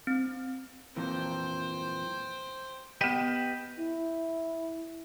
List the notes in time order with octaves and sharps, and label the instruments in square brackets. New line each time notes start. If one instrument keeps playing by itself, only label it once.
[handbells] C4
[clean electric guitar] F2 A#2 E3 [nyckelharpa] C5 G5
[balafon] B3 G5 [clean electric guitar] G4 B4 D#5
[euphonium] E4